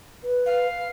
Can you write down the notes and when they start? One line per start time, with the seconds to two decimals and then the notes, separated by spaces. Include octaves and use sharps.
0.23 B4
0.46 F5